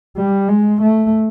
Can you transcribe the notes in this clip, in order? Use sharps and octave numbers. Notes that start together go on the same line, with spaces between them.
G3
G#3
A3